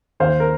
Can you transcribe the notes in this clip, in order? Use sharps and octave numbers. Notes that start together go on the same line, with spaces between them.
D#2 C5 F5
A#4